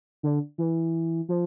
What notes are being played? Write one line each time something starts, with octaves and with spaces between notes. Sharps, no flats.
D3
E3
F3